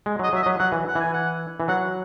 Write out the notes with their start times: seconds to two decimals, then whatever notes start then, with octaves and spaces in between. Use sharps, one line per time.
0.06 G#3
0.19 F#3 D#5
0.33 F#3 E5
0.42 D#5
0.46 F#3
0.59 F#3 F#5
0.72 E3
0.88 F#5
0.95 E3 G#5
1.13 F#5
1.60 E3
1.68 F#3 F#5